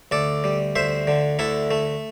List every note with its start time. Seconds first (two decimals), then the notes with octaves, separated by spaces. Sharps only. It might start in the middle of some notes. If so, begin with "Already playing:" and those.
0.11 D2 A4 D5
0.44 G3
0.76 D2 C5 E5
1.07 D3
1.39 D2 E4 A4
1.71 A3